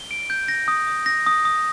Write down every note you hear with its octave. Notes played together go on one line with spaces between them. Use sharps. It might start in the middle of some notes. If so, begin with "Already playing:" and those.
Already playing: G7
D7
G6
A#6
D#6
D#6
A#6
D#6
D#6